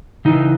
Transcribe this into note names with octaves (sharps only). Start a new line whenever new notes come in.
C#3 E3 D#4